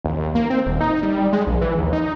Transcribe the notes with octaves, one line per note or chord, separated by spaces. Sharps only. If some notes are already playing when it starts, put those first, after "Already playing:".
D#2
A#3
C4
D#1
D#4
G3
G#3
A#1
E3
D#2
D#4